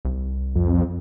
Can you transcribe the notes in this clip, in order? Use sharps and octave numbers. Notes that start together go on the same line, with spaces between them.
C2
F2